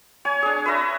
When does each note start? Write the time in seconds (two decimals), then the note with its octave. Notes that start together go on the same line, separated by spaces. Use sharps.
0.25 C#5 G#5
0.42 D4 G#4
0.66 B4 C#5 E5 A#5